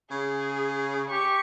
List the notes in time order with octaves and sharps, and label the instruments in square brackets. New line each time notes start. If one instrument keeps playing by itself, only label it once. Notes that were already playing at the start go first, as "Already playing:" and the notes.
[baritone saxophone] C#3 [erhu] G#4
[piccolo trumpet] G4 [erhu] C#6